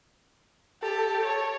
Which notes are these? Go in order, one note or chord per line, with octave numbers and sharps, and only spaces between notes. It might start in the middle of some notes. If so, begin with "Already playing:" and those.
G4 A4
C#5